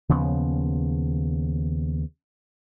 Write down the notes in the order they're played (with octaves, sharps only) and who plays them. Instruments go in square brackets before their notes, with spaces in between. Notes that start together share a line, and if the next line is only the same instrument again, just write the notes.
[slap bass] D#2 C#3 F3 B3